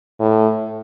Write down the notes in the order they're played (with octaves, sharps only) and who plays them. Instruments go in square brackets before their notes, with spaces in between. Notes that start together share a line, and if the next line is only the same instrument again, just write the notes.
[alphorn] A2